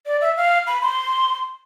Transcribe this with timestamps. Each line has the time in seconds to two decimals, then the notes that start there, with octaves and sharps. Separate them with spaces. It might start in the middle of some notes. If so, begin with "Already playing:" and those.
0.06 D5
0.21 E5
0.37 F5
0.67 B5
0.82 C6